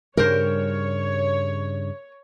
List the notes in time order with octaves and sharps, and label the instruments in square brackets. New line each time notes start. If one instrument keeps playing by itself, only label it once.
[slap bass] G2 C#3 G3 [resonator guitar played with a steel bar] A#4 C5 [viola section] C#5